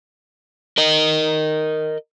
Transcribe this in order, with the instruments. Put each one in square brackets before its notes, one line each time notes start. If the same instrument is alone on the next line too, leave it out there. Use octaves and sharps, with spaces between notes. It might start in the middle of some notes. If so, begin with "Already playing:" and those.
[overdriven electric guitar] A#4 D#5